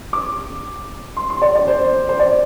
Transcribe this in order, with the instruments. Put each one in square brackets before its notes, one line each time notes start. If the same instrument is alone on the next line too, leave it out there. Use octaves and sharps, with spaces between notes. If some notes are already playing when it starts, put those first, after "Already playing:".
[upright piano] D6
C6
C6
D5
D5
C5
C5
D5